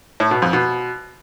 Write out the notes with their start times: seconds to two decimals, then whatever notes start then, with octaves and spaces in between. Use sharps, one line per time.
0.20 A2
0.31 B2
0.42 F2
0.53 B2